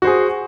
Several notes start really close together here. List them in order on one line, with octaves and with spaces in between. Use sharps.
F#4 C5 G#4